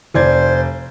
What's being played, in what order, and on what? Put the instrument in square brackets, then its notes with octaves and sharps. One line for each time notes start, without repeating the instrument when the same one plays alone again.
[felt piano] F1 D5 G#6 [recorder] C5